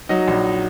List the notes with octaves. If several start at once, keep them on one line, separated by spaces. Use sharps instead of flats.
F#3 D#4 D#5
A#1